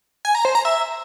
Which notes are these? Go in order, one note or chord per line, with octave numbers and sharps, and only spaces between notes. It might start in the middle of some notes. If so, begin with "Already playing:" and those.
G#5
A#5
C5
A#5
E5